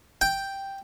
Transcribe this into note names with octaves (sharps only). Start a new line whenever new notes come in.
G5